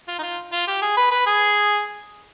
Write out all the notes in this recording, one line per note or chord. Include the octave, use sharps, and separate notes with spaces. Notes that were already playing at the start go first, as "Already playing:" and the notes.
F4
D#4
F4
F4
G4
G#4
B4
B4
G#4